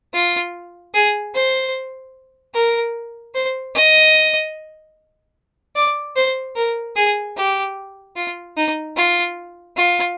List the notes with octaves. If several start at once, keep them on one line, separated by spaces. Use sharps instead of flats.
F4
G#4
C5
A#4
C5
D#5
D5
C5
A#4
G#4
G4
F4
D#4
F4
F4